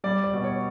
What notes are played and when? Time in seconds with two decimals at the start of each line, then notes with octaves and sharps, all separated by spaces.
0.04 G3 D5
0.24 D5
0.33 B2
0.44 C#5